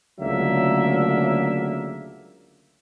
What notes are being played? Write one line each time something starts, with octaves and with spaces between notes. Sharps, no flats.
C#2 D3 F#3 A3 A#3 E5